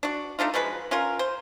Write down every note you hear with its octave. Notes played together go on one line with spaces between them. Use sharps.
D4 F#4
A3 D4 D#4 F4
F3 F#3 G#3 B4
C#4 F4 A#4
C5